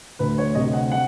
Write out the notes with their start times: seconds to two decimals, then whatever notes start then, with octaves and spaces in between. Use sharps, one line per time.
0.19 D2 B4
0.38 C#5
0.55 C3 D#5
0.73 F#5
0.92 F#5